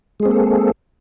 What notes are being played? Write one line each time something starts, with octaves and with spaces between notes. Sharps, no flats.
G#3 A#3 C4 G#4 A4